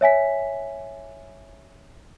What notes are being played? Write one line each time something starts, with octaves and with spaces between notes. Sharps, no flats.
C#5 E5 G#5 B6